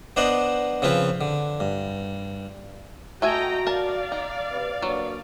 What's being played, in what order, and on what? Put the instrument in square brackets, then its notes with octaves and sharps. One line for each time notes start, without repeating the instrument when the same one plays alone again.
[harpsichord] B3 D4 C5 D5 D#5 F#5
C#3 F3 C4 F4 B4 C#5
D3
G2
[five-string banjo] A3 E5 G#5 [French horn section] F#4 [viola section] D#5 G5 A#5
[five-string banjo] A#4 A5 [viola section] D5 F5
[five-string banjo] D#4
[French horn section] C3 B4
[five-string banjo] F#3 [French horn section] A#3 D4 B4